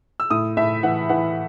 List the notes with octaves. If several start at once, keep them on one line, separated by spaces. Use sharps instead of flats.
E6
A2 D#6
A2 E5
E3 F#5
E3 F#5